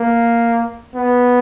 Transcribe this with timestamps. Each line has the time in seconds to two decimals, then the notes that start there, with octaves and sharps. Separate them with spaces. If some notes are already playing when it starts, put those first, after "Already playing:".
Already playing: A#3
0.95 B3